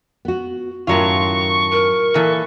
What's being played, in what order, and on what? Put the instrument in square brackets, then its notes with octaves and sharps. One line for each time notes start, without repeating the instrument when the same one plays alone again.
[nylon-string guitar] B3 F#4
[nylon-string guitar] F#2 D#3 [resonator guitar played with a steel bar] A2 F#3 F4 [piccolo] C#6
[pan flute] A#4
[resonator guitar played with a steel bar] A#2 E3 A4